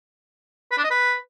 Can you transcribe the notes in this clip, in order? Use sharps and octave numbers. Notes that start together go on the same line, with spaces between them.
B4
D4
D#5
B4